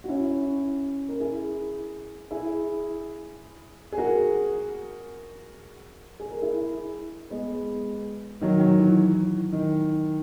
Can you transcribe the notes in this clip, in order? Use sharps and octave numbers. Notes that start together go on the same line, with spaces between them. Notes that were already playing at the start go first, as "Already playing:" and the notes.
F#4
C#4 E4
A#4
E4 G#4
E4 G#4
G#4
F#4 A#4
G#4
A#4
E4 G#4
G#3 B3
D#3 F#3
D#3 F#3
E3
D#3